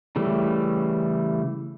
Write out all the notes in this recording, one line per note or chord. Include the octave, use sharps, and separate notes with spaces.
C#3 E3 G3 A3